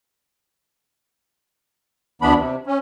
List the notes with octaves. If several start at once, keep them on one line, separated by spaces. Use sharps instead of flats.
D2 E3 B3 D4 B5
C3
C#4